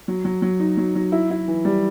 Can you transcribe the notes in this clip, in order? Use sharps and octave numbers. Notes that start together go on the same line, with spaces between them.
F#3
F#3
F#3
D#4
F#3
F#3
E4
E4
E3
G3